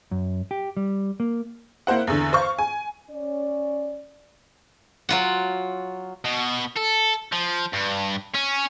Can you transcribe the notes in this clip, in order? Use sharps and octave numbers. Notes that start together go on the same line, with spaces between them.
F#2
G4
G3
A#3
A#3 E4 C5 F#5
E2 D3
C5 F5 C#6
G#5
C#4 D5
F#3 F4 F#5
B2
A4
F3
G2
C#4